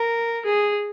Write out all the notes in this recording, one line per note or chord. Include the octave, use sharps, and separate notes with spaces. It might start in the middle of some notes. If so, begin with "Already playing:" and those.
Already playing: A#4
G#4